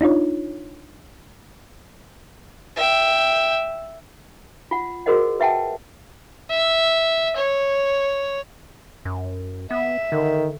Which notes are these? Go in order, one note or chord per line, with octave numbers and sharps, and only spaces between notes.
D4 D#4 F4 C#5
E5 G5
F4 F#5
F#4 G#4 A#4 C5 D#5 F#5
B4 E5 F#5 G5 A5
E5
C#5
F#2
B3 E5
D3 D#3